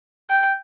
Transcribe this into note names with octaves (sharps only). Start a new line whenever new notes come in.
G5